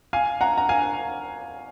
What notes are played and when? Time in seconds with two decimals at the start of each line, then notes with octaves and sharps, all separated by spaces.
0.13 F5 G#5
0.41 F#5 A#5
0.57 A#5
0.69 F5 G#5